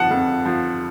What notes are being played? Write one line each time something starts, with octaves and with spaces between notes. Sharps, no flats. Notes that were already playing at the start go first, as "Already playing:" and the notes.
Already playing: F2 F3 F#5 A5
F2
F3